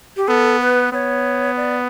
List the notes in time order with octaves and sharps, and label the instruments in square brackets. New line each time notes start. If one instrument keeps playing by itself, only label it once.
[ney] G4
[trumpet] B3 [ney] A4
[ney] B4
[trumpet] B3 [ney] C#5
[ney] D5